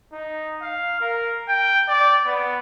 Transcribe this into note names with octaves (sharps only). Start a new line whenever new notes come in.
D#4
F5
A#4
G5
D5
B3